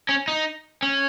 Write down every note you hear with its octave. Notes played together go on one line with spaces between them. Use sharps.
C#4
D#4
C#4